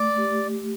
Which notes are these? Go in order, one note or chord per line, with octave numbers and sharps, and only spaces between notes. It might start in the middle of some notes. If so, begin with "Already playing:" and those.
Already playing: A3 D5
G4